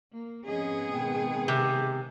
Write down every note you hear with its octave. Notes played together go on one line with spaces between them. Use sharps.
A#3
F2 G#2 B3 C#4 G#4 D#5
B2 D#3 C4 G5
C3 D6